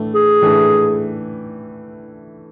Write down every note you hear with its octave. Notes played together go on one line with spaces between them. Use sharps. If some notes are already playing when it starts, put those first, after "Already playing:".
Already playing: A2 E3 A3 D4
G#4
A2 E3 A3 D4